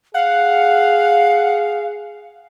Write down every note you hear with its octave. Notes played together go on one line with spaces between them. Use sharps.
G#4 F5 F#5